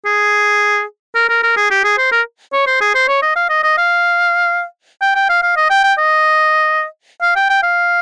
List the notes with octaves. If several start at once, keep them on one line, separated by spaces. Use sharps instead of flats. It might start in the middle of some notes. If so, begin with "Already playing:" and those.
G#4
A#4
A#4
A#4
G#4
G4
G#4
C5
A#4
C#5
C5
G#4
C5
C#5
D#5
F5
D#5
D#5
F5
G5
G5
F5
F5
D#5
G5
G5
D#5
F5
G5
G5
F5